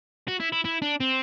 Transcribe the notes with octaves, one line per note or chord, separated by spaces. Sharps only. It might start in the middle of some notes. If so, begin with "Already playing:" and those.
F#4
E4
E4
E4
D4
C4